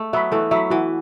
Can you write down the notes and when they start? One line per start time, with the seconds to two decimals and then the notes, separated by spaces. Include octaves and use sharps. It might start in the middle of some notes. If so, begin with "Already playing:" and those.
Already playing: A3
0.13 F#3 B3 E5 B5
0.32 E3 A3 A4
0.51 F#3 E5 B5
0.71 E3 F#4